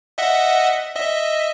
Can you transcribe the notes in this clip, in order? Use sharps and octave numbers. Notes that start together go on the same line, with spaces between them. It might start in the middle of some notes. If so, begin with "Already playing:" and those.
D#5 E5 F#5
D#5 E5